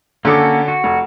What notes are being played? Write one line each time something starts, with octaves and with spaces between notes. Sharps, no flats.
D3 A#3 C#4 F#4 A4 D6
F#4
F1